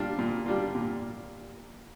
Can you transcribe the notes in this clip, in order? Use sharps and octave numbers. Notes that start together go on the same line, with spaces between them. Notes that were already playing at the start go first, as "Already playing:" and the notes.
Already playing: A#2 G3 D4 F4
A#2
G3 D4 F4
A#2